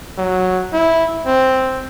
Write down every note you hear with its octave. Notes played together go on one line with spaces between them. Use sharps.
F#3
E4
C4